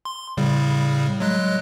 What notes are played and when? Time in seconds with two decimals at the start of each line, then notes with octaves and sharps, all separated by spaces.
0.05 C6
0.37 A2 C#3 G3
1.20 F#3 G#3 F#6